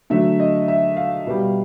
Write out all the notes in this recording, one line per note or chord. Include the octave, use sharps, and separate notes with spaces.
D3 F#3 A3 E5
D#5
E5
F5
B2 G3